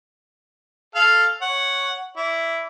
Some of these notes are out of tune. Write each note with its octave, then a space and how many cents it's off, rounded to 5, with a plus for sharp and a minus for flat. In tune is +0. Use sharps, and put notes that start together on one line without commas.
A4 +0 F5 +0
C#5 +0 F#5 +0
E4 +5 D5 -25